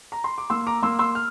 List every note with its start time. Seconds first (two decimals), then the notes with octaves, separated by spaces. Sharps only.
0.12 A#5
0.24 C6
0.38 D6
0.50 A#3 C6 E6
0.67 A#5 D6
0.82 A#3 C6 E6
0.99 C6 E6
1.15 F6